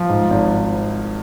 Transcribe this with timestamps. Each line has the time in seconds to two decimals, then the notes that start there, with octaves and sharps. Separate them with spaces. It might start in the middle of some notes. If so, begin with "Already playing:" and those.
Already playing: F3
0.09 G#2
0.30 G#1